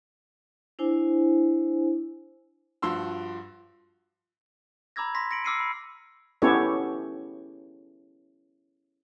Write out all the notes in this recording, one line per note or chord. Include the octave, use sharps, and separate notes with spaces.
D4 E4 C5 G#5
G2 F3 F#4 C6 E6
A#5 B5 D6 E6 G#6 A#6
C6 A#6 B6
A#6 C#7 D7 F#7
D6 E6 F6 C7 C#7 D#7
B5
B3 C#4 E4 G4 A4 C#5